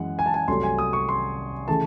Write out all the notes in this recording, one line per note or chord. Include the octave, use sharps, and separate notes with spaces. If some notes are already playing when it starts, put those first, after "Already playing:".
Already playing: F#2 E3 G#3 F#5
G#5
A5
G#5
C2 C3 F#3 A3 C6
G#5
D#6
C#6
C6
C#3 E3 A3 A5